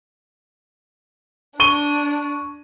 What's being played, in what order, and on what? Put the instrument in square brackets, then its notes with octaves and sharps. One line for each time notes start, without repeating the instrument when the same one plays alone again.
[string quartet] D4 [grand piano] C#6 D#7 G7